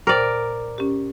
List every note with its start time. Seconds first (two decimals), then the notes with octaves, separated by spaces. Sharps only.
0.07 A#2 A#4 C5 D5 G5
0.78 C#4 G4